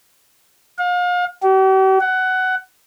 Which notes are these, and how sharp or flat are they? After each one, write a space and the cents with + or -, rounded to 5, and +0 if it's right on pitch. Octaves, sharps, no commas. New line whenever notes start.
F5 +35
G4 -45
F#5 +15